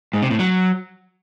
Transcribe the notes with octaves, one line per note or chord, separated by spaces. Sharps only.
G#2
C3
A2
F#3